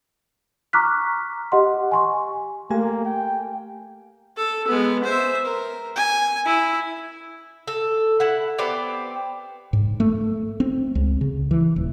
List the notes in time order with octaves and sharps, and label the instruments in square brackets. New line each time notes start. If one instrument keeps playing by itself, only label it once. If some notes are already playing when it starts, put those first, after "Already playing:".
[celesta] A#5 C#6 D6 F6 F#6 B6
G4 D#5 F#5 C6
G#5 C6 C#6
[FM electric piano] A3 G4 G#5 [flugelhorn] A#3
[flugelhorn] G5
[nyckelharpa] A4
G#3 B3
C5 E5
A#4
G#5
E4
[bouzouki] A4
E4 F#5
B3 C4 G4 D5
[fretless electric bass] G#2
A3
C4
C#2
C#3
E3
D#1